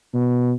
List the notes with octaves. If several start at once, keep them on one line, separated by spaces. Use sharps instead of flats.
B2